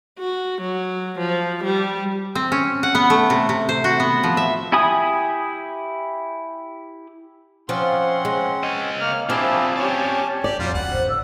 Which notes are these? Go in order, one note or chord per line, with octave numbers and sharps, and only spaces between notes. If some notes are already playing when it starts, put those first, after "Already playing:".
F#4
F#3
F3
G3
C4
C#4
F#5
B3
A3
C3
C3
C5
F#4
B3
F3
E5
E4 G4 G#5 B5 D#6
F3 C4 C#4 F#5 C6
G#3
C#5 D#5
A#3 F6
C4 D4 E4 F4 G4 G#4 A5
C#4 G4 C#5 D5 G#5 A5
A#3 G4 D5
F2 F#3 G3 F4
D2 F#5
A1 D3 C5
E6